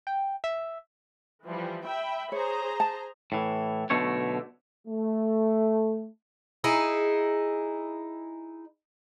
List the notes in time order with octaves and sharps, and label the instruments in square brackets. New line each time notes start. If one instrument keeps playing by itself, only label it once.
[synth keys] G5
E5
[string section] E3 F3 G3
E5 G5 B5
[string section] G#4 C5 A#5 [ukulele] C#5
[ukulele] A5
[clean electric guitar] A2 E3
B1 B2 D3 A3 C#5
[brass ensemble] A3
[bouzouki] D#4 E4 G#4